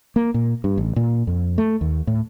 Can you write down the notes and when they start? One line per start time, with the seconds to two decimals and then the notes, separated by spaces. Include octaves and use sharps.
0.16 A#3
0.34 A#2
0.64 G2
0.78 A1
0.96 A#2
1.27 F2
1.58 A3
1.81 D#2
2.07 A2